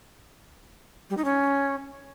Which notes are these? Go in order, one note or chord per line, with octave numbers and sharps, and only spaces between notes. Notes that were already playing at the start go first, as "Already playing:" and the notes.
G3
D#4
C#4